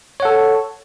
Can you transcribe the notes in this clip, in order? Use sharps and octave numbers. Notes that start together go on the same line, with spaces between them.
A4 C#5 F#5